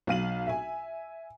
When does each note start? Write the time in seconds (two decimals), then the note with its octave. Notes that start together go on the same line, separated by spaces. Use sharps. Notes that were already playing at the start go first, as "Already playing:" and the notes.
0.07 B1 F5 D#7 F#7
0.47 E5 G#5